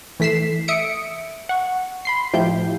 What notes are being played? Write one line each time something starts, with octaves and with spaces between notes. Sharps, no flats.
E3 A3 B6 C7 E7
E5 D#6 C#7 D7
F#5 C#6
B5 C6 C7
A2 F3 E4 F4 G4 G6